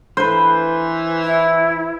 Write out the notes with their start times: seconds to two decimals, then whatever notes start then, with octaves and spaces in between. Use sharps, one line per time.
0.17 E3 B4 C5
1.23 E4